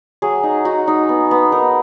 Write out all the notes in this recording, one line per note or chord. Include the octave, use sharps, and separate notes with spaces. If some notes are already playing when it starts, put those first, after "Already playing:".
F#3 G#4
D#4
D#4 F#4
D#4
B3
B3
D#4 A#4